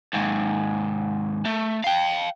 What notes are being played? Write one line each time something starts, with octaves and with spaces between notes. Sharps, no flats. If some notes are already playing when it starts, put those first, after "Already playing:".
D#2 G#2
A3
F5 G5